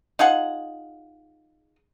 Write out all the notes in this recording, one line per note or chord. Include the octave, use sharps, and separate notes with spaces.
D#4 F4 G#4 F#5